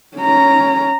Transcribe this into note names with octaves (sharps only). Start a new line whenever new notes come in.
C#4 A#5